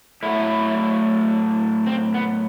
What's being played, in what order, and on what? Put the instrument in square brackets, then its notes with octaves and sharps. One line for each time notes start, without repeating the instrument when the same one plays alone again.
[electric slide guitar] A2 F#3 A3 E4
C4
B3